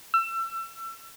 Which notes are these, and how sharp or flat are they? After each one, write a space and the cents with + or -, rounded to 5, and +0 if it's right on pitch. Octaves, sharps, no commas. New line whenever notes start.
E6 +30